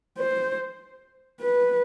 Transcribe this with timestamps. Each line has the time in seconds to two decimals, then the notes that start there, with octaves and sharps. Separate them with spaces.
0.18 C5
1.40 B4